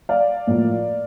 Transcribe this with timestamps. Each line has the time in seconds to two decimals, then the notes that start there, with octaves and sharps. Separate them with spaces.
0.09 D5 F5
0.47 A2 F3 A#3